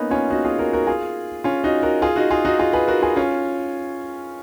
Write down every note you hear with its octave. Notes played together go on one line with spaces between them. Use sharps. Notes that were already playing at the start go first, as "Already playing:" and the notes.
Already playing: A#3 B3 C#4 D#4
C#4 F4
D#4 F#4
F4 G#4
F#4 A#4
F#4 A#4
F4 G#4
C#4 F4
D#4 F#4
F#4 A#4
F4 G#4
D#4 F#4
F4 G#4
D#4 F#4
F4 G#4
G#4 B4
F#4 A#4
F4 G#4
C#4 F4